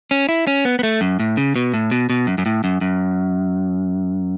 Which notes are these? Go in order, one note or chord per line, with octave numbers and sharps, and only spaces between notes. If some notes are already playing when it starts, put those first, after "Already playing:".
C#4
E4
C#4
B3
B3
A3
F#2
A2
C#3
B2
A2
B2
B2
F#2
F#2
A2
F#2
F#2